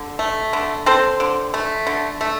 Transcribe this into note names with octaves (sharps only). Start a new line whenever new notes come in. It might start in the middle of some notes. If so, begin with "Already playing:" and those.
Already playing: D3
A3
D3
C4 A4 C5
D3
A3
D3
A3